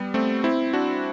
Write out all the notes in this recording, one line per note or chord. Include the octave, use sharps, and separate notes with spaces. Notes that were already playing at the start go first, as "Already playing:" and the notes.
Already playing: G3 B3
A3 C4
C4 E4
D4 F#4